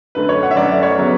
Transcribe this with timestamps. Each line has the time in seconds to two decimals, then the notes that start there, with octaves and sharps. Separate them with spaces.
0.15 F#2 D3 A3 B4
0.29 C#5
0.43 F#5
0.51 E5
0.56 F#2 D3 A3 D5
0.83 C#5
0.98 C#3 F#3 B3